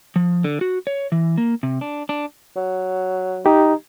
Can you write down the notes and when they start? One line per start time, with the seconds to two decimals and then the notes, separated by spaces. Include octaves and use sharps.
0.16 F3
0.44 D3
0.61 F#4
0.87 C#5
1.12 E3
1.38 A#3
1.63 C3
1.81 D4
2.09 D4
2.56 F#3
3.46 D#4 G4